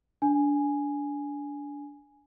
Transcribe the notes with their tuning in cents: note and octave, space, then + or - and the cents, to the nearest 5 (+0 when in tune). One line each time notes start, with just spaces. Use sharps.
D4 -20 G#5 +0